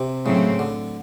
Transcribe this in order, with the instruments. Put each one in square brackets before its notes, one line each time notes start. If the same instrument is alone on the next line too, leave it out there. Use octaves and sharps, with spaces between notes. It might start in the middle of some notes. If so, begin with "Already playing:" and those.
Already playing: [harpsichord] C3
[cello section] A2 F#3 A3 C4 [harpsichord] C#3
[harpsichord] D3